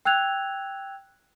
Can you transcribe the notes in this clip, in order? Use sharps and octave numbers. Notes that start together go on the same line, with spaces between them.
G5 E6 F#6 G#6 F7